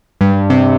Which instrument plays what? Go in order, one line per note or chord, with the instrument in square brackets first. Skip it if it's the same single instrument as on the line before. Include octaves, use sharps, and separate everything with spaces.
[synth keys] G2
C3